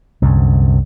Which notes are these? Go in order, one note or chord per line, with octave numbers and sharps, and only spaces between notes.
C2 F#2 D3